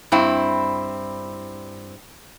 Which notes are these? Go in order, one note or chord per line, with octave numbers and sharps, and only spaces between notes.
G2 C4 E4